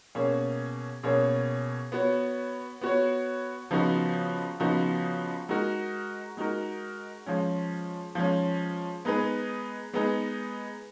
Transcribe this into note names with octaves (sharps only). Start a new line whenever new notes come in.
B2 A#3 C#4 G#4 C#5
B2 A#3 C#4 G#4 C#5
B3 F#4 C#5
B3 F#4 C#5
C#3 F3 B3 D#4 F#4
C#3 F3 B3 D#4 F#4
G#3 D#4 F#4 A#4
G#3 D#4 F#4 A#4
F3 G#3 C#4
F3 G#3 C#4
G#3 B3 D#4 G#4 B4
G#3 B3 D#4 G#4 B4